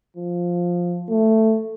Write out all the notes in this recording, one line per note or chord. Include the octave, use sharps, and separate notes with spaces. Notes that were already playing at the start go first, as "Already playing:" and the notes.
F3
A3